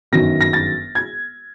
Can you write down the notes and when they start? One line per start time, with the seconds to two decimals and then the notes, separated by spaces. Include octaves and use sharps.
0.12 G1 F#2 D#3 F#3 A#6
0.41 A#6
0.53 A6
0.95 G#6